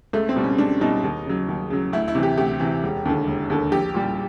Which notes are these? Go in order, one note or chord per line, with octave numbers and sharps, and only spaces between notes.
C#2 A3
C4
B2 G3
C#4
C#2 D4
B2 G3 D#4
D#2
C#3 F#3
D#2
C#3 F#3
D2 E4
E4
C3 E3
G4
D2 G4
C3 E3
E1
D#2 D3
E1
D#2 D3
A#1 G4
A#2 G3